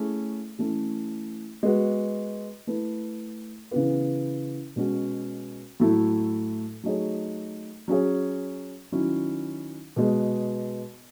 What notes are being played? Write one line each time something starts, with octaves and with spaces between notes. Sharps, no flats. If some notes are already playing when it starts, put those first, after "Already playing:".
Already playing: A3 C#4 E4 G#4
E3 A3 C#4
G#3 B3 F#4
A3 E4 B4
C#3 E3 B3
B2 G#3 C#4 F#4
A2 F#3 A3 E4
F#3 A3 D#4 G#4 C#5
F#3 C#4 G#4 C#5
D#3 F#3 C#4 E4
B2 G#3 B3